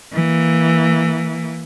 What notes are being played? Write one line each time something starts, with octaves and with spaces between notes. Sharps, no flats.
E3 A#3